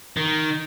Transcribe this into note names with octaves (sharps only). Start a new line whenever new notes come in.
D#3